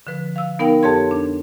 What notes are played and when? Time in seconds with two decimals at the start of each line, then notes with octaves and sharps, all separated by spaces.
0.07 D3 F3 B4
0.36 F5 E6
0.59 B3 D#4 A#4 F5 G5
0.83 F2 G4 A4 C#5 C6 G#6
1.11 D4